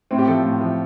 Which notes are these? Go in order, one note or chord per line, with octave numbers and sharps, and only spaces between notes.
A2 C4
G4
F3 A3 A4
A2
F3 A3